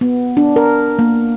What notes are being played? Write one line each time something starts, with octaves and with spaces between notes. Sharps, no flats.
B3
D4
A#4
A#3